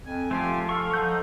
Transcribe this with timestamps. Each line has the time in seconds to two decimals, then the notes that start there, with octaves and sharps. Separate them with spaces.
0.06 F2 G#5
0.31 F3 A3 F4 G4
0.69 A4 F5 C#6
0.94 F3 D#4 F#5 G6